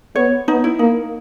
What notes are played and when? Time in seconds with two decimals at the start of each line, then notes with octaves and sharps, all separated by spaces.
0.16 B3 C#5
0.48 B3 D#4
0.64 E4
0.79 A#3 D#4